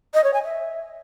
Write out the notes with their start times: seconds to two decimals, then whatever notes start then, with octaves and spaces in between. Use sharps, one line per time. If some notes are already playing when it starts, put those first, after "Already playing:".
0.14 D#5
0.24 C#5
0.34 G#5
0.44 E5